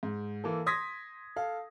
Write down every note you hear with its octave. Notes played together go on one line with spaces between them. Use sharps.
G#2
E3 A#3 A4
C6 D#6 G#6 A#6 B6
A4 F5